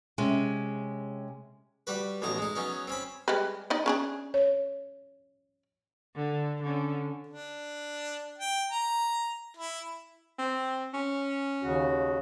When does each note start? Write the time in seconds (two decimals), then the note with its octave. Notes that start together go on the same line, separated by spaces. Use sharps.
0.18 C3 G#3 C#4
1.87 G3 F#4 B4
2.22 A1 B2 F#3 D#4 A#5
2.38 G#3 D#4
2.56 F#3 B3 C#4 D#4
2.88 C4 C#4 B5
3.28 G3 G#3 B4
3.70 D#4 D5 D#5
3.86 C#4 D4 G#4
4.34 C#5
6.16 D3
6.62 D3 C#4
7.27 D4
8.38 G5
8.72 A#5
9.57 E4
10.39 C4
10.94 C#4
11.63 D#2 C#3 F#4